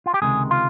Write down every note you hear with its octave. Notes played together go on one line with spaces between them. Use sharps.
F4
G4
C#2 C3 D#3 G#3 G#4
F4